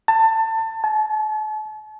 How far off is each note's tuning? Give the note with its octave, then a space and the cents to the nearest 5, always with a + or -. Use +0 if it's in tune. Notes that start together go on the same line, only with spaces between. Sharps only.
A5 +25
A5 -40